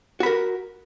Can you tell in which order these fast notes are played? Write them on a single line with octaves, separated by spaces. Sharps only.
F#4 B5 A#4